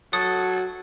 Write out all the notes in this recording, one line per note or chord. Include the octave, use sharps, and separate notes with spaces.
F#3 F#4 A4 D#6